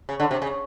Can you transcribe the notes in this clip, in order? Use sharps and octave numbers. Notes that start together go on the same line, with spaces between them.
C#3
D3
C3
C#3